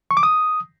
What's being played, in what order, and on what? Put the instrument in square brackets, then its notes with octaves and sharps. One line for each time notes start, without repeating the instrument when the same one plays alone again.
[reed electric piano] C#6
D6
D#6